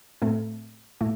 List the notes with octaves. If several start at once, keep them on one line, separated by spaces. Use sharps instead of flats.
A2 A3 C4
A2 A3